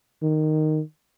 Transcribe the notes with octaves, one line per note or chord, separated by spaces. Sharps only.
D#3